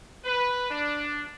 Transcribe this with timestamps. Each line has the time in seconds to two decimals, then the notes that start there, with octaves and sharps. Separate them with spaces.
0.25 B4
0.71 D4